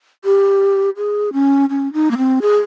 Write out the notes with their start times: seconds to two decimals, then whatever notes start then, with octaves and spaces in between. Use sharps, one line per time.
0.25 G4
0.97 G#4
1.33 C#4
1.70 C#4
1.93 D#4
2.11 A#3
2.17 C4
2.42 G#4